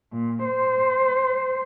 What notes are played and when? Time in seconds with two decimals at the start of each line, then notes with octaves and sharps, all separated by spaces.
0.12 A#2
0.45 C5